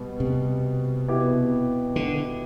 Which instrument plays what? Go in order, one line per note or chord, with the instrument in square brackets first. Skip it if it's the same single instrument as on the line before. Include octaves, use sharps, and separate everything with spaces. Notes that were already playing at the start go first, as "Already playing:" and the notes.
Already playing: [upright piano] B2 G3 B3
[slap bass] C3
[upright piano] B2 B3 E4 G4
[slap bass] D3